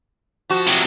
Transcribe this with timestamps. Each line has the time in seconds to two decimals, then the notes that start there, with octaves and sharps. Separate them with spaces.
0.50 F3 F#4
0.67 C3 F#3